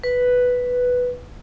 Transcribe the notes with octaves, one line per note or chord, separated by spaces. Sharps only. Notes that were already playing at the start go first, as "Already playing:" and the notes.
B4